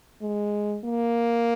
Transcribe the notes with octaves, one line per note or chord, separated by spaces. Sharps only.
G#3
A#3